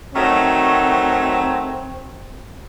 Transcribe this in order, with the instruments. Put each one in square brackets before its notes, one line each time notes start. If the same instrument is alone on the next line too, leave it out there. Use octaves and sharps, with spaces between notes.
[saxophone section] D#3 F#3 A3 [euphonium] C4